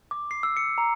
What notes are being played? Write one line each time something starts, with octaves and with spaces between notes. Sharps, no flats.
D6
C7
E6
C#7
A#5